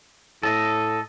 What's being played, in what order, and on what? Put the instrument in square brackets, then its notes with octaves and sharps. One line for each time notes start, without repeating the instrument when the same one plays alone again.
[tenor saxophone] A2 [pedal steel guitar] A4 D#5